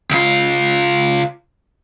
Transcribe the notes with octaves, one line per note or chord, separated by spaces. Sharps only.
C#2 F4